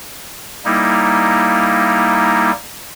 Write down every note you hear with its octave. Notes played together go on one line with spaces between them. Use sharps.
G3 A#3 D#4 E4